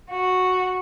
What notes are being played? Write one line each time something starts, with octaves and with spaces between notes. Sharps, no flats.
F#4